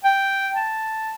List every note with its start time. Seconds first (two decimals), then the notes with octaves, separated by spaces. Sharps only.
0.04 G5
0.56 A5